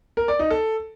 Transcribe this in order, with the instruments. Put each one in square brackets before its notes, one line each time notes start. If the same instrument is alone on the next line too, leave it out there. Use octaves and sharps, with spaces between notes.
[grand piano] A#4
D5
D#4
A4